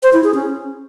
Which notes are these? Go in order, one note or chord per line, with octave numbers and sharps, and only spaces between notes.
C5
E4
G#4
C#4